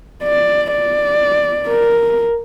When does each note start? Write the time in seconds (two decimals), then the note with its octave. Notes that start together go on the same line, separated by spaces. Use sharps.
0.24 D5
0.72 D5
1.68 A#4